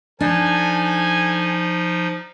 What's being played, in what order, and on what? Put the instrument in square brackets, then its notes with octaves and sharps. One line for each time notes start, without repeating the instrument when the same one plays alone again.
[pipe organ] F3 D#4 [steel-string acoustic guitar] D4 [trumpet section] A4 G#5